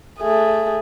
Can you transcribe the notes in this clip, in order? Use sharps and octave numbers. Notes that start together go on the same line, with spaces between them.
A3 G#4